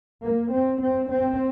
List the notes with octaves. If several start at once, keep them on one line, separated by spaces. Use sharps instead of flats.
A#3
C4
C4
C4